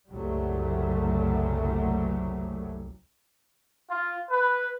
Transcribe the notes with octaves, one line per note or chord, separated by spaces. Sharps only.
F#1 C2 F#2 F#3 G3 A3
F4
B4